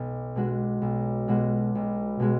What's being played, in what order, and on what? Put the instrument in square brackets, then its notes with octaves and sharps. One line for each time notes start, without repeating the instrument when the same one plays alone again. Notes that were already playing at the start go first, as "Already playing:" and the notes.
Already playing: [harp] B1
B2 G#3 D4 F#4
B1
B2 G#3 D4 F#4
B1
B2 G#3 F#4